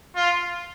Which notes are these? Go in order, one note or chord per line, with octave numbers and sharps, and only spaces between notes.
F4